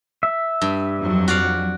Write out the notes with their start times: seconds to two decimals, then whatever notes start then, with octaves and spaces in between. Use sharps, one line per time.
0.23 E5
0.62 G2
0.98 F2 F#3
1.28 F#4 D5 F5